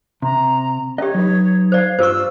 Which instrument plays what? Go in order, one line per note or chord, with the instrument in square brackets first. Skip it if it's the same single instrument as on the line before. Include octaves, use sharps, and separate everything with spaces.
[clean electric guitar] C3 [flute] A#5
[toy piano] C#4 G4 [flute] C#5 [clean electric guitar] D#5
[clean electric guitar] F#3 D#4 B4
[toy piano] C5 D5 [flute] F5
[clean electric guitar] G2 G3 F4 [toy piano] C5 C#6 [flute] E6